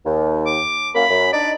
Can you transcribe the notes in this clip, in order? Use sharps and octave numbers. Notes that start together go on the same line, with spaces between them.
D#2
D6
F#2 A#3 B5
F#2
D4 D#4 D5